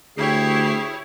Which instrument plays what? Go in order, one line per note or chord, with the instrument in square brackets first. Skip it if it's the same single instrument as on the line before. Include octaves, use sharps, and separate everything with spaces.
[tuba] D2 [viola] E4 C#5 [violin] G4 C7 [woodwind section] G#4